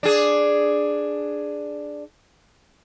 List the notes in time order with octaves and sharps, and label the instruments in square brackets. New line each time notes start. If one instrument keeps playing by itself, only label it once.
[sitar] D4 G#4